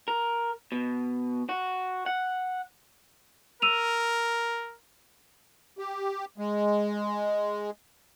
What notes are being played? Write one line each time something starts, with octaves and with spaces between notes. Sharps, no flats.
A#4
B2
F#4
F#5
A#4 E6 D#7 F7
G4
G#3